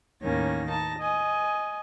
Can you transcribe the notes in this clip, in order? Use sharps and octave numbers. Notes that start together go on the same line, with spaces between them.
D#2 A2 D#3 A#3 C#4 A#6
D#4 A5 A#6
D#5 G#5